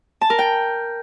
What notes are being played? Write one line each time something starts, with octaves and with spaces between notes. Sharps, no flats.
A5
A#4
G5